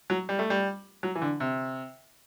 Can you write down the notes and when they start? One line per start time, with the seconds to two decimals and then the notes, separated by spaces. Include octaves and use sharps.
0.10 F#3
0.29 G3
0.39 A3
0.50 G3
1.03 F#3
1.15 E3
1.22 D3
1.40 C3